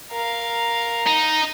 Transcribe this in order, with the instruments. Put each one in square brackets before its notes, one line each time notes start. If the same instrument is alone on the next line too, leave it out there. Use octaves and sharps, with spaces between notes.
[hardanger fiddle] A#4 F5
[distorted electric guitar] D#4